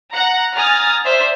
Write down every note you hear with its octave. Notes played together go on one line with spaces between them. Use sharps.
F#5 A#5
G#5 A#5 D#6 F6 A6
C5 D5 E5